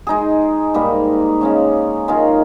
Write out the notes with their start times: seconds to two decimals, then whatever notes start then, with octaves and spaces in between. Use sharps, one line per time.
0.07 G#3 D#4 G#4
0.74 G#2 G3 A#3
1.41 C#3 G#3 C#4
2.08 D#3 G#3 C#4 F4